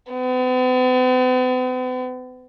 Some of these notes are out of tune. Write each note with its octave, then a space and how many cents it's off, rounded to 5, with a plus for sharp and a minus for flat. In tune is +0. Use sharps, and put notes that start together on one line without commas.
B3 +45